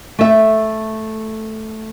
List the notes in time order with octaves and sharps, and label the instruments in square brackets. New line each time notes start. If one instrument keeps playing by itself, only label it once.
[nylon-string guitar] A3 E5